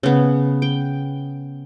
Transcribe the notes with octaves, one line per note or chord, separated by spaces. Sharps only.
C#3 B3
G5